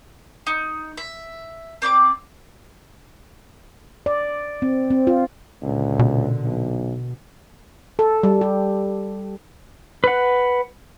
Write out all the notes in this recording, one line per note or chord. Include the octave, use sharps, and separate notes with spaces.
D#4
E5
C4 D5 E5 D6
D5
C4
C4
F4
C#2 A#2 D3
B2
B1
A4
G3
G4
B4 F#5